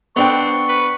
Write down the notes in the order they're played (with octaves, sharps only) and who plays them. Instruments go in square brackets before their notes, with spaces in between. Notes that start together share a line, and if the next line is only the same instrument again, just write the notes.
[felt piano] B3 D4 G5 [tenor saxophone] C4 [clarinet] C#6
[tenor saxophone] B4